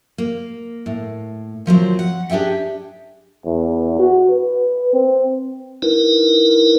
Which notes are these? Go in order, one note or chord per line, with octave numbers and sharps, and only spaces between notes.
A#3
A2
D#2 F3 F#3 C4
F#5
D4 G4 G#4 E5 G5
E2
F#4
B4
C4
D#4 E4 A#4 B4